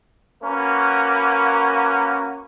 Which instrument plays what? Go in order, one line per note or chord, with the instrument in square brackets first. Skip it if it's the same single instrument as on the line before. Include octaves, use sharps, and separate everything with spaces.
[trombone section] A#3 C#4 F#4 A#4 B4